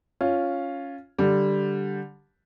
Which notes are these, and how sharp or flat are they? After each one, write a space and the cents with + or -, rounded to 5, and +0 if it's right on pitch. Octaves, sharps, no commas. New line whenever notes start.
C#4 +0 F4 +0
D3 +0 G3 +0